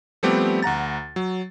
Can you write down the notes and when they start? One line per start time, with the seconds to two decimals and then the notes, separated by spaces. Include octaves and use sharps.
0.23 F3 G3 A3 B3 C4 G4
0.62 D2 F#5 A#5 A6
1.16 F#3